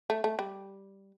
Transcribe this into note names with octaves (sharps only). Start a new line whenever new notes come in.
A3
A3
G3